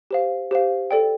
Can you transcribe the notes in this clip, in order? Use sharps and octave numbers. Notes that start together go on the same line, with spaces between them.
G4 C5 F5
G4 C5 F5
A4 D5 G5